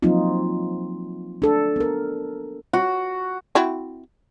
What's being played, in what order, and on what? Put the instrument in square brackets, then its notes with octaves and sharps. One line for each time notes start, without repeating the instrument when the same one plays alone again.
[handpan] F3 F#3 A#3 C4 D#4 F4
D4 A4
B3 A#4
[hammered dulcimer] F#4
[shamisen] C4 E4 F#4